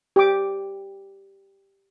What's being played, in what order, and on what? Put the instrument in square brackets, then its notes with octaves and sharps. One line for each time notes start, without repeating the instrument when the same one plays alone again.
[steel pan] G4 D6